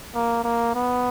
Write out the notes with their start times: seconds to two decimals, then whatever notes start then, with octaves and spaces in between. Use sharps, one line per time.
0.15 A#3
0.44 A#3
0.75 B3